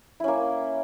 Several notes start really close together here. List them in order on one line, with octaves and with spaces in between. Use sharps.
E4 C#4 A#3